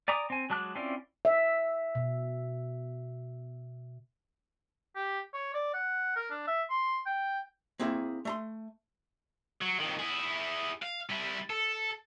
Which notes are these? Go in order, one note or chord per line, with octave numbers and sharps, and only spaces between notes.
D5 G#5 A#5 D6 D#6
C4 G#5
F#3 G#3 A5 D6 F#6
C4 C#4 E4 F4 D5
E5
B2
G4
C#5
D5
F#5
A#4
D4
E5
C6
G5
A#3 C4 E4 G#4
A3 A#5 C6
F#3
F2 D#3
E4 G#4
F5
G3 E4
A4